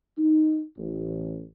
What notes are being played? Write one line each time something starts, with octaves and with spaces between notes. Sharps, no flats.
D#4
A1